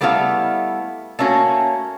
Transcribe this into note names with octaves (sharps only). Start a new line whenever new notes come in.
G3 A3 B3 E4 A4 F5
A3 A#3 C#4 F#4